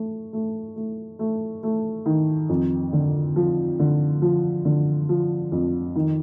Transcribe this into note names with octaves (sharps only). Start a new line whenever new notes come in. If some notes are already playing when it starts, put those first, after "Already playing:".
Already playing: A3
A3
A3
A3
A3
D#3
F2
D3
F3
D3
F3
D3
F3
F2
D#3